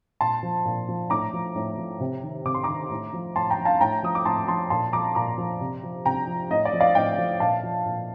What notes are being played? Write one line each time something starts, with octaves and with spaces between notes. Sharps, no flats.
A#2 A5 C6
F3
A#2
F3
A2 A#5 D6
F3
A2
F3
C3
D#3
C3 D6
C6
D#3 A#5 D6
A2
F3
A2 A5 C6
G5 A#5
F3
F5 A5
A2 G5 A#5
F3 D#6
D6
A2 A5 C6
F3 A5 C6
A#2 A5 C6
F3 A#5 D6
A#2 A#5 D6
F3
C3
F3
C3 G5 A#5
F3
A2 D#5
D5
F3
D5 F5
A2 D#5 G5
F3
A#2 F5 A5
F3
A#2